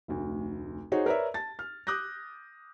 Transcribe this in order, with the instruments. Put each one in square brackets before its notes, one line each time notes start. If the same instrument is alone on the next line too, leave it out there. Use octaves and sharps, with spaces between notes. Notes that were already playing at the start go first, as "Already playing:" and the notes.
[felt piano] F1 D2
D#4 F#4 G#4 C5 C#5
A#4 B4 C#5 D5 E5
A5 A6
F6
D6 D#6 F#6 G6 A#6